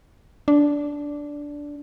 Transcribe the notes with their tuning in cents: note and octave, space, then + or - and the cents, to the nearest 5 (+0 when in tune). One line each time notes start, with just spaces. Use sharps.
D4 -10